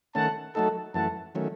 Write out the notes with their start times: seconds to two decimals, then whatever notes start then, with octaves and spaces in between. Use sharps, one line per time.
0.15 D#3 A3 C#4 F#5 A5
0.55 F#3 A3 D#4 A4 F#5 A5
0.94 F#2 E3 A3 F#5 A5
1.35 D#3 F#3 A3 C#4